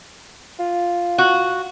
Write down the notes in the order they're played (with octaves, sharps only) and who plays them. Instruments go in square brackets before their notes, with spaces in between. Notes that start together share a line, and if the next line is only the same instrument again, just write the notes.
[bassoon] F4
[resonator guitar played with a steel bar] F#4